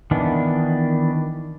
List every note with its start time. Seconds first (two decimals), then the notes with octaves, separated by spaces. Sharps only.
0.11 D#3 E3 B3 D4